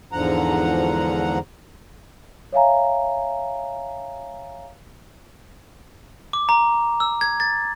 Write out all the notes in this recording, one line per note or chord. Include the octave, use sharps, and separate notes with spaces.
E2 G#2 D3 F3 F#5 A#5
C#5 E5 F5 G#5 A#5
D6
A#5
E6
G#6
A6